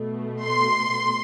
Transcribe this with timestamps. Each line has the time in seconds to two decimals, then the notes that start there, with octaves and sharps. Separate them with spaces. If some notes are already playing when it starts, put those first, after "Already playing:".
Already playing: B2 A3
0.43 C6